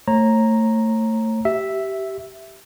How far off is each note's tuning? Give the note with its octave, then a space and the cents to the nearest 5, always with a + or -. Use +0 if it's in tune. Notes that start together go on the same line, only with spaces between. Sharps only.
A3 +25 C#5 -35 A#5 +0
G4 -20 E5 +0